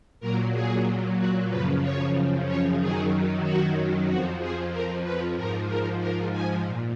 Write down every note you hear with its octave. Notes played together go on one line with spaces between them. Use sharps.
A#2 F#3 A#4
G#4
F#4
F#2 C#3 F3 B4
C#5
C#5
F#2 D#3 F#3 G#4
F#4
F2 F3 F#4
G#4
A#4
B4
G#2 F3 A#4
A#4
A#4
G#5
A#2